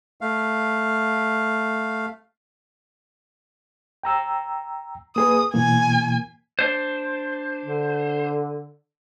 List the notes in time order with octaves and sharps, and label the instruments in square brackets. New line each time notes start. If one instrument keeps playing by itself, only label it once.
[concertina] A3 F5
[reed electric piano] G5 A#5 E6
[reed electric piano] A#3 G#4 B4 [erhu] D#6
[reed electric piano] B2 E3 A#3 [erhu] G#5
[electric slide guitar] D4 C5
[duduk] D3